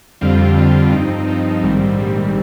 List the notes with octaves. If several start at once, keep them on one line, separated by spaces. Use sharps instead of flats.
F2 D3 G3 C4 F4
F2 D3 G3 C4 F4
G2 F3 C4 D#4
G2 F3 C4 D#4
A#1 G#2 D#3 G3 C4
A#1 G#2 D#3 G3 C4